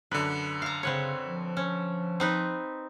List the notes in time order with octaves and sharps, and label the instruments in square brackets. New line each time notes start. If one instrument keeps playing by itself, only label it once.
[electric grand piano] F#2 D3 [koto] B4
[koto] F5 A#5
[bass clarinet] C#3 [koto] C4 B4 C#5
[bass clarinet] F3
[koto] C#4
C4 D#4 B4